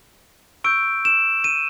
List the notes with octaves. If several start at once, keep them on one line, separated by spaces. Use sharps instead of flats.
C#6 E6 G6 D7
E7
D#7